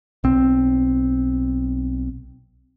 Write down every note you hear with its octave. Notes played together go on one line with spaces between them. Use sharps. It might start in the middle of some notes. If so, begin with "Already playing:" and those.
B1 C4